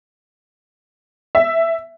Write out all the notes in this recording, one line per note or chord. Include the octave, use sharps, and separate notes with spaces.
E5